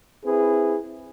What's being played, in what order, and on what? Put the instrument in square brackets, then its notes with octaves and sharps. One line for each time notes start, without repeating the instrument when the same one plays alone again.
[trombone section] C4 E4 G#4 B4